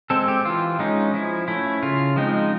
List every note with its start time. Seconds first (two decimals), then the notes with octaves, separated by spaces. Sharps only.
0.10 G#3 C4 A4
0.28 G4
0.45 E3 F4
0.79 G#3 C#4 D#4
1.14 F3 E4
1.48 A3 C#4 E4
1.83 C#3 F4
2.16 F3 G#3 C4 D#4